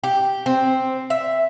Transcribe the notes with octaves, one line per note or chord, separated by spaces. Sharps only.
G4
C4
E5